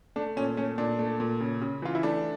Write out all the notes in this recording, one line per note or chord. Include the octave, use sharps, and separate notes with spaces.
A3 D4
A#2 C#4
A3 C#4
A#2 D4
A3
A#2
C#3
C#3
E3 F4
E4
A3 D4